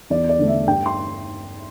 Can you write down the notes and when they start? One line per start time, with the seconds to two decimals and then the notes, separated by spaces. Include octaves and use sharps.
0.10 E2 D5
0.29 D5
0.39 D3 A3
0.48 E5
0.67 G2 G5
0.86 C6